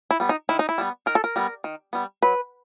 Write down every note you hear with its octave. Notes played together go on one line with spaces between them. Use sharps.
E4
G3 B3
D#4
D#3 E4
D#4
E4
G3 B3
D#3 A#4
A4
A#4
G3 B3
D#3
G3 B3
F#3 B4